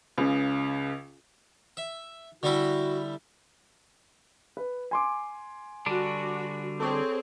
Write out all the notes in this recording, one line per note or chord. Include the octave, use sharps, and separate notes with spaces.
C#2 C#3
E5
D3 G3 E4 F#4
B4
G#5 C6 D6
D3 G3 D4 F#4
C4 G#4 A4 C#5